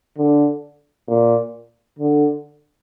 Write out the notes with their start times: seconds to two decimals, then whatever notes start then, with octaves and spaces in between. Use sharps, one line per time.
0.18 D3
1.08 A#2
1.99 D3